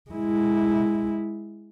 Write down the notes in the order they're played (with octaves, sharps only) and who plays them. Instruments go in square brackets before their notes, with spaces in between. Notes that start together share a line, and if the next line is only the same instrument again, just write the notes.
[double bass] G#3 E4